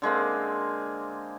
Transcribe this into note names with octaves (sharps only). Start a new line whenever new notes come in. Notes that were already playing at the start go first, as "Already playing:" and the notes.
D3 G#3 A#3 C4